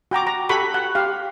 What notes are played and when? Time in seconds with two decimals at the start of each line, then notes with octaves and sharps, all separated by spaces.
0.11 F#4 G5 A#5 D6
0.27 A#5
0.49 F#4 G4 A4 F#5 B5 C#6
0.74 F#5
0.95 G4 F5